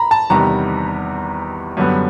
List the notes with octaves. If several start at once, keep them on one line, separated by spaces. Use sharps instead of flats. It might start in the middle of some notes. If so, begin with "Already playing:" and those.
Already playing: A#5 B5
A5
E2 C3 D#3 G3 B3 A#5
F#2 D3 G3 B3